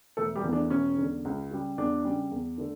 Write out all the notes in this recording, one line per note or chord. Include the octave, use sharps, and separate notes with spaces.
E1 A3 A4
G3 G4
E2 E3 A3
D4
E1 C#4
E2 D3
C#2
C#3 G3
E2 D4
C#3 G3
E2
D3 A3